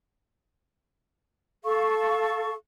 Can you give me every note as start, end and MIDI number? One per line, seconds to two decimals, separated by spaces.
1.64 2.53 69
1.64 2.53 77
1.64 2.53 85